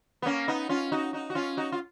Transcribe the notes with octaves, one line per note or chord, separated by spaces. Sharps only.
B3
A#3 C#4
B3 D#4
C#4 F4
D#4 F#4
D#4 F#4
F#4
C#4 F4
D#4 F#4
F4